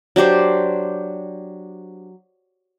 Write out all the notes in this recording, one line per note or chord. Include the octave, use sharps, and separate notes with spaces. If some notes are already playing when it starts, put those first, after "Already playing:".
F#3 D4 G4 C5